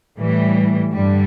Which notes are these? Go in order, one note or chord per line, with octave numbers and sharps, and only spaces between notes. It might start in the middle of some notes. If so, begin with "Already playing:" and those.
A2 E3 G3
G2 D3 G3